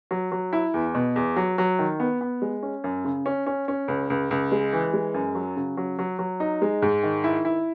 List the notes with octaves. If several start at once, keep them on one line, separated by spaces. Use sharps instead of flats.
F#3
F#3
E4
E2
B2
E2
F#3
F#3
D#3
B3
B3
G#3
C#4
F#2
C#3
C#4
C#4
C#4
C#2
C#2
C#2
G#3
E3
G#3
F#2
F#3
C#3
F#3
F#3
F#3
D#4
G#3
G#2
D#3
E4
E4